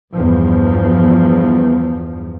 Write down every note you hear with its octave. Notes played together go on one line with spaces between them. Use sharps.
E2 G2 F3